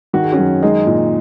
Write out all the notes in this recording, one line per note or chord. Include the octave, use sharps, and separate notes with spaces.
D#3 F#4
G#4
C#4 F#4
F#2
G#3 D#4 G#4
A#2